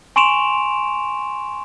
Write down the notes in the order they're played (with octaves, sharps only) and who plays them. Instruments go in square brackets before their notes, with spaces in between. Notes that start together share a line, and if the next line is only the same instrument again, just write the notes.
[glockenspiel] G#5 C6 C#6 D7 E7 F7